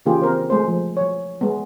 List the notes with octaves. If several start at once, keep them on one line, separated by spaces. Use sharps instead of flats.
C#3 E3 A#3 F4 G4 G#4
C4 A#4 C5
G#3 A3 C5
F3
F#3 C#5
G#3 B3